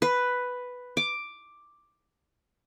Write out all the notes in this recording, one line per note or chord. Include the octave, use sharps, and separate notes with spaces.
B4
D6